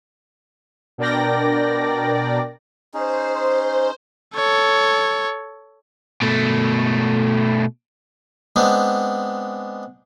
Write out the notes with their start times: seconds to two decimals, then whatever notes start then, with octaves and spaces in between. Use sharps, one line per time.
0.98 B2 D4 A#4 D5 G5 A#6
2.94 C#4 D#4 G#4 C5
4.35 A4 C#5
6.22 B2 A3
8.56 G#3 B3 C4 D4